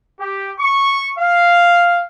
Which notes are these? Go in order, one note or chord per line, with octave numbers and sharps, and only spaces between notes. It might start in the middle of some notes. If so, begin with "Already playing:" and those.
G4
C#6
F5